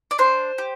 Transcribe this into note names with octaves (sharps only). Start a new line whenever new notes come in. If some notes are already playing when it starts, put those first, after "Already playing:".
D5
D4 C5
G4